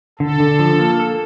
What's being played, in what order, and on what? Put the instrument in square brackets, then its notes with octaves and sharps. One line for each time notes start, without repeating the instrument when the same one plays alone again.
[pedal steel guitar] D3 [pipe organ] A4
[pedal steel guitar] D3
F3
A#3
A4